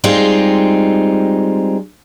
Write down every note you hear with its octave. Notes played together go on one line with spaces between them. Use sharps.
G3 G#3 C4 D#4 F4